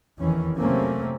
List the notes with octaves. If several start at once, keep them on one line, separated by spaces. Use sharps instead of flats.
F1 E2 D#3 E3 C#4
C3 F#3 A3 A#3 C4 C#4